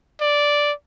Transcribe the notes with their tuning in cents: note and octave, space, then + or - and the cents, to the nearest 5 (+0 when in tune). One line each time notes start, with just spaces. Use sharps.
D5 -5